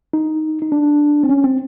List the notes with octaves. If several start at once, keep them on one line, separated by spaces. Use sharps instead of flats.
D#4
D#4
D4
C4
C#4
C4